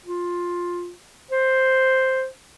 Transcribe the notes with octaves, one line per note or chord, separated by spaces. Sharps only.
F4
C5